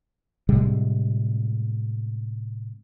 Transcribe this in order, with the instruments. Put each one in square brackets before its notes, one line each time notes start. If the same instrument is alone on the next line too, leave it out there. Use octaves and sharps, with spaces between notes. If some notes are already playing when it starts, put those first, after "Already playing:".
[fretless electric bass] A2 C3 G3 G#3